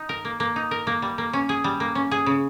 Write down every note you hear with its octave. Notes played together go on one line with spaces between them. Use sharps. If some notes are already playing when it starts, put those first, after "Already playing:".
Already playing: D#4
A#4
A#3
A#3
D#4
A#4
A#3
G3
A#3
C#4
G#4
G3
A#3
C#4
G#4
C#3